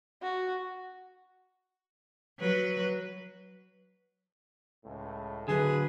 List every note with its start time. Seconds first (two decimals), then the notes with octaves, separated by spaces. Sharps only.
0.22 F#4
2.39 F#3 B4
4.85 C#2 A2
5.48 D2 D3 F#3 G#4 B4